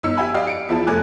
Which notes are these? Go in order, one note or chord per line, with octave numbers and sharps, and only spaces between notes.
G1 D#4 E6 C#7
G4 E5 G#5 B5
G4 D5 D#5 F5
C#7 D7
E2 F3 E4 G#4 A5
F1 A3 G#5 D6 F#6